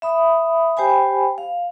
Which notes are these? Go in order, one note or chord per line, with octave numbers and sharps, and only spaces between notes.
E5 B5 D#6
G4 C5 G5 G#5 B5
F5